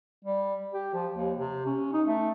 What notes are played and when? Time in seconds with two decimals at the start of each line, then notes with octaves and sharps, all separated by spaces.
0.25 G3
0.73 G4
0.94 F3
1.14 D#2
1.38 C3
1.66 C#4
1.93 D#4
2.07 A3